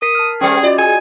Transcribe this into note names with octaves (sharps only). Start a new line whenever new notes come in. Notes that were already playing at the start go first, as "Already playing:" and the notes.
A#4 D#6 B6 C7
A5 F6
G3 B3 C#4 G4 G#4 D5
F4 F#4 D5 D#5
G#4 G#5